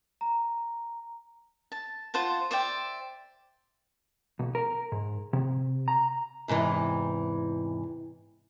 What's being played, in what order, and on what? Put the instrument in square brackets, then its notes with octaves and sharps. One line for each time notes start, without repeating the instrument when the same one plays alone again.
[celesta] A#5
[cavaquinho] A5
F4 C5 F#5 A5
C5 D5 E5 G5
[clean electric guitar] B1
A#4
G#2
C3
A#5
[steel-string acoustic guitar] E2 G#2 C3 E3